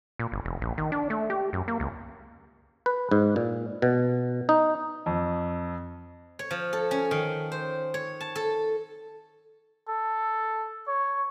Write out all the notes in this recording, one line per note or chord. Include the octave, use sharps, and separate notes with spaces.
A#2
G1
F1
A#1
D#3
D4
A3
G4
F#2
A#3
C#2
B4
G#2
A#2
B2
D#4
F2
C#5
F3
A4
C#4
D#3
C5
C#5
A5
A4
A4
C#5